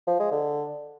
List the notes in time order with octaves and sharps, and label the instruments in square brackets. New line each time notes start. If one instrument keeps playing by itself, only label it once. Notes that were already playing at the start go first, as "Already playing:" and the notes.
[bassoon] F3
G#3
D3